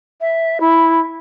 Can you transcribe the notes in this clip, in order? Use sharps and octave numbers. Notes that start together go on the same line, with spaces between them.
E5
E4